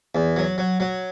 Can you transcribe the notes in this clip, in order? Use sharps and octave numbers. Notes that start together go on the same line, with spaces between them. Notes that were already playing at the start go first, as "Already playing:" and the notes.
E2
F#3
F#3
F#3